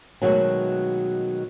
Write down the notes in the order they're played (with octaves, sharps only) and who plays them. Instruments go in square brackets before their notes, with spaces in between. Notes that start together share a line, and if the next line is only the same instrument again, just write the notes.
[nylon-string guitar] B2 D#3 F#3 G#3 A3 F#4